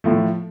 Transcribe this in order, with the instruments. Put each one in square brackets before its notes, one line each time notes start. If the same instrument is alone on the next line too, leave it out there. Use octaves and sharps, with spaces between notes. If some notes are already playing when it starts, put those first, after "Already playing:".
[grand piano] A2 F3 A3